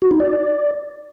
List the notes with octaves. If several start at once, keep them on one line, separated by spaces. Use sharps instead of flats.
F#4
D#4
D5